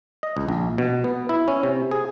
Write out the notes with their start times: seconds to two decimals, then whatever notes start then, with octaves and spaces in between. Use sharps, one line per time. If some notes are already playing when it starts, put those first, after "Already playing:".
0.23 D#5
0.37 C#2
0.48 A#1
0.78 B2
1.04 B3
1.29 E4
1.48 C#4
1.63 C3
1.91 G#4